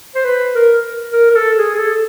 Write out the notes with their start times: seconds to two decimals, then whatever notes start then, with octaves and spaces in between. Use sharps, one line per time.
0.15 C5
0.24 B4
0.55 A#4
1.12 A#4
1.30 A#4
1.36 A4
1.58 G#4
1.74 G#4
1.79 A4